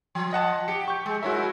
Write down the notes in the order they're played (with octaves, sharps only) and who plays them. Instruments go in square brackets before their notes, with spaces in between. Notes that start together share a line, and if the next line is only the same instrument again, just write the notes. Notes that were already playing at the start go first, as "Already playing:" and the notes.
[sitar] F3
[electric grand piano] D#5 F#5 A5
[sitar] G4 [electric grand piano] C#7
[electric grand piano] C#6 G6
[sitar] G#3
[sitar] G#3 E4 A#4 [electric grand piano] F#4 C#5 E5